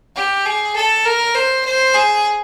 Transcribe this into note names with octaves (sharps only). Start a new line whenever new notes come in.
G4
G#4
A4
A#4
C5
C5
G#4